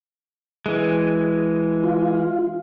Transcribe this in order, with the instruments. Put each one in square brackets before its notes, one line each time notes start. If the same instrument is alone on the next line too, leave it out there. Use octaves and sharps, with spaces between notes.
[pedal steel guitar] E3 G#3
[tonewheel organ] F4